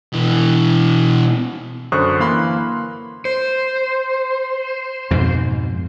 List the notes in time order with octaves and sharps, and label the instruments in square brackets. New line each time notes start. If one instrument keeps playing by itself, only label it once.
[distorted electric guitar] B2 E3
[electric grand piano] F#2 D3 C5 C#6 D#6 F#6
E3 A#3 F5 B5 C6
[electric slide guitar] C5
[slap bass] F2 G#2 B2